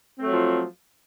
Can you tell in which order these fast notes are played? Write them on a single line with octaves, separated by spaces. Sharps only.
C4 A3 F#3 F3